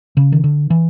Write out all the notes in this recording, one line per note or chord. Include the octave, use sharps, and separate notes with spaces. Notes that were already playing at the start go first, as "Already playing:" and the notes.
C#3
D#3
D3
E3